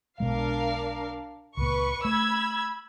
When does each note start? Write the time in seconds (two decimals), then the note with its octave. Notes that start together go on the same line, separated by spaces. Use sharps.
0.20 B1 B2 G#3 D4 A#4 F5
1.57 C#2 A#2 B4 C#6
2.05 A3 B5 E6 G#6